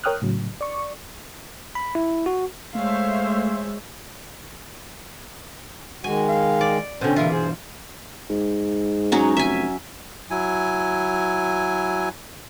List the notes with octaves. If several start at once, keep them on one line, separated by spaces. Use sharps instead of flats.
A#4 C#5 G5 D#6 F6 F#6
A2 C#3 F#3
D5 C#6
B5
E4
F#4
G#3 A3 C5 C#5 E5 F5
D#3 G#3 F#4 G#5
F5
D5
B2 D3 C4 C#4 C5
C3 E3 A#3 F4 E5
G2 G#4 C5
G#2
F#3 C#4 D#4
F1 E5 G#5
F#3 E4 G#5